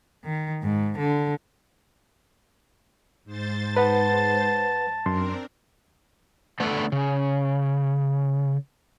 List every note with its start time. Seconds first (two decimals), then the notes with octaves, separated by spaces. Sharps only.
0.24 D#3
0.63 G#2
0.98 D3
3.24 G#2 C5 A6
3.77 B4 F#5 A5
5.06 F#2 C4 D4 A#4 C6
6.60 D3 A3 B3 A4 B4
6.92 C#3